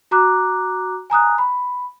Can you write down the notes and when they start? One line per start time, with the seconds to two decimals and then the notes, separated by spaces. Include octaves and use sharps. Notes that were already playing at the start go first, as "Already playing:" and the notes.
0.11 F#4 A#5 D6 F#6
1.10 G#5 A#5 D#6 F#6
1.38 B5